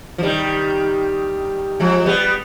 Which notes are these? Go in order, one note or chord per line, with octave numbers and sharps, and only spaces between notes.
F3
D#3 G3
F3 G#3
G3 B3